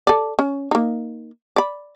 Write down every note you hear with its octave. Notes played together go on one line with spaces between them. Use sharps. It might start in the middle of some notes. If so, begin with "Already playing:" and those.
A4 D5
C#4
A#3 D#4
D5 B5